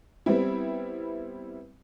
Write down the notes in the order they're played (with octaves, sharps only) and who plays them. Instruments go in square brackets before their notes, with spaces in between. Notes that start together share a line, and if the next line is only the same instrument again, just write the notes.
[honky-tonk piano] G3 B3 C4 E4